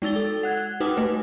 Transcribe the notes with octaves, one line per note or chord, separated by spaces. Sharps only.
G#3 D#4 E6 A6 G7
A4
F#5 F#6 G#6
D#4 F#4 B4 G5 D6 D#6
A3 B4